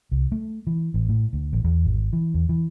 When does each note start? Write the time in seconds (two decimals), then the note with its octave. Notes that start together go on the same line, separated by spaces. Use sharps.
0.11 C2
0.32 A3
0.67 E3
0.94 A1
1.09 A2
1.33 D2
1.53 A1
1.64 E2
1.85 G#1
2.13 E3
2.34 E2
2.49 E3